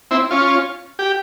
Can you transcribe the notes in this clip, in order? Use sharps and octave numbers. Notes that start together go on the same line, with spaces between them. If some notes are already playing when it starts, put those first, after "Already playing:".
C4 E4
C#4 F4
G4